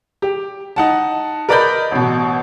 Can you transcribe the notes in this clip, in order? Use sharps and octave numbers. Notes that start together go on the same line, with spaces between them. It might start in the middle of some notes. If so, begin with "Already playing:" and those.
G4
D#4 F#5 A5
A#4 B4 D5 D#5 B5 G6
A1 B2